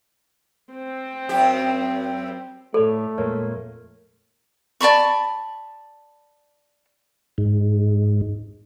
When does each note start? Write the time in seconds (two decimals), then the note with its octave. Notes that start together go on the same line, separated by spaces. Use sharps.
0.73 C4
1.29 F#2 G4
2.74 A2 A3 A4 C#5 D5
3.18 F2 A#2 G#3 A#4 C#5
4.81 D5 A5 B5 C#6
7.38 G#2